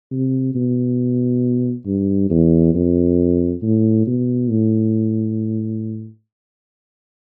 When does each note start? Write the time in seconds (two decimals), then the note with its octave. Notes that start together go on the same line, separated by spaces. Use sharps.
0.11 C3
0.55 B2
1.87 G2
2.30 E2
2.75 F2
3.63 A2
4.07 B2
4.50 A2